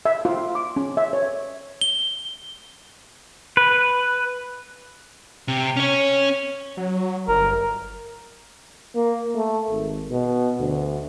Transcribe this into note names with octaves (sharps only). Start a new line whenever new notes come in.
E5
F4
D6
C#4
E5
C#5
G7
B4
C3
C#4 C#5
F#3
G1 A#4
A#3
A3
G#1
B2
D2